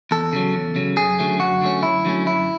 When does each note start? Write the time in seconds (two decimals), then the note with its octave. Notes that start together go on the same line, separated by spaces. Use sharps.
0.11 E2 A4
0.33 C#3 F#3
0.54 E2
0.76 C#3 F#3
0.97 F#2 G#4
1.19 D3 F#3 A3 C#4
1.40 F#2 F#4
1.62 D3 F#3 A3 C#4
1.83 F#2 E4
2.05 D3 F#3 A3 C#4
2.27 F#2 E4